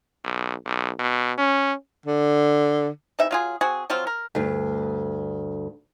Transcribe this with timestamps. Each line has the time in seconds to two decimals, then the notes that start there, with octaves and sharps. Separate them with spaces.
0.24 B1
0.66 B1
0.99 B2
1.38 C#4
2.06 D3
3.19 C3 E3 D#4 E5
3.31 F#3 F4 G#4
3.61 C4 F#4 G#4
3.90 F3 F#3 C4 F4
4.07 A#4
4.35 D2 G2